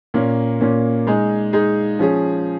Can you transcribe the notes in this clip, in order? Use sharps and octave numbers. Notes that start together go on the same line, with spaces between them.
A#2 A#3 C#4
A#2 A#3 C#4
G#3 D#4 G#4
G#3 D#4 G#4
F3 C#4 G#4